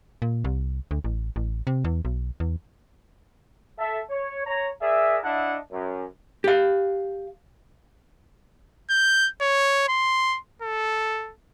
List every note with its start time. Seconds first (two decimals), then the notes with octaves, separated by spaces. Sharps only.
0.22 A#2
0.44 C2
0.91 D2
1.05 A1
1.36 A1
1.67 C3
1.84 E2
2.05 B1
2.40 E2
3.79 A4 E5 A5
4.10 C#5
4.47 C#5 A#5
4.82 G#4 A#4 D5 E5
5.23 D4 E4 D#5 E5 F#5 A5
5.72 F#2
6.44 G4 F5
8.90 G6
9.41 C#5
9.89 C6
10.62 A4